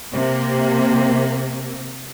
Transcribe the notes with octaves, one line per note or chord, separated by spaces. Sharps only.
C3 A#3